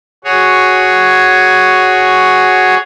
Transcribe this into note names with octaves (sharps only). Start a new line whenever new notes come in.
F#4 G#4 C#5